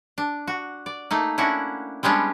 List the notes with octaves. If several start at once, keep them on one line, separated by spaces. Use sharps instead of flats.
D4
F#4
D5
A3 A#3 D#4
C#4 D4 E4 F#4
G3 G#3 B3 C#4 D4